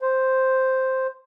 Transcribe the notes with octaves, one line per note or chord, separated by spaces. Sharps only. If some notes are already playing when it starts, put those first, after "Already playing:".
C5